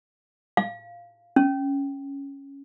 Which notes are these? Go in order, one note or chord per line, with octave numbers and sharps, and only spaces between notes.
F5
C#4